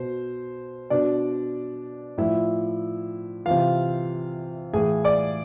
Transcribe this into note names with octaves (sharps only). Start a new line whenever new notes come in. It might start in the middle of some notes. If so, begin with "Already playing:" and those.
Already playing: B2 C5
B2 D4 D5
A2 F3 E4 E5
C3 E3 F4 F5
A2 E3 G#4 G#5
D5 D6